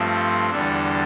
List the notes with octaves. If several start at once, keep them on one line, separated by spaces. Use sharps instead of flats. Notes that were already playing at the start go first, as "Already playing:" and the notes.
Already playing: G2 F3 A3 C4
E2 D3 G3 D4 A4